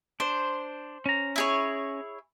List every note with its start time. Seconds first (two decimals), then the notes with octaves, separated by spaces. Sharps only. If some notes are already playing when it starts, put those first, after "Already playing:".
0.20 D4 C5
1.06 C#4 A#5
1.36 E4 G#4 C#5